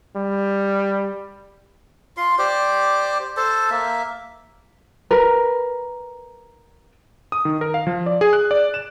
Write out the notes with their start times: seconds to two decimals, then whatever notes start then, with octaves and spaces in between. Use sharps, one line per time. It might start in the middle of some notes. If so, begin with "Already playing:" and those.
0.16 G3
2.17 F4 C6
2.39 G4 C5 D5
3.37 A4 C5 A5
3.71 A#3 E5
5.11 A#4 B4
7.32 D#6
7.45 D#3
7.61 A#4
7.74 F5
7.87 F3
8.06 D5
8.21 G#4
8.33 F#6
8.51 D5
8.74 E7